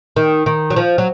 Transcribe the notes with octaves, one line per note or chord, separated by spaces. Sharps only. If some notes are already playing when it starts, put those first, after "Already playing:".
D#3
D#3
F#3
F3
F#3